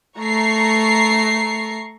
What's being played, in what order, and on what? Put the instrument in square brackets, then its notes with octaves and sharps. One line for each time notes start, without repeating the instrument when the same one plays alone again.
[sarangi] A3 [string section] A#5 C#6 C7